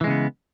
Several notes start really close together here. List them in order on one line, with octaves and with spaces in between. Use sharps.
E3 G#3 C#3 B3